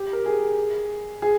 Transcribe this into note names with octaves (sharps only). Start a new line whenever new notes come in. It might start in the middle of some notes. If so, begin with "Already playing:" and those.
Already playing: G4
A#4
G#4
G#4